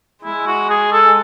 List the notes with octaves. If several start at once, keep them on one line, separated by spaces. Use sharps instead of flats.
G#3 E4
F#4
G#4
A4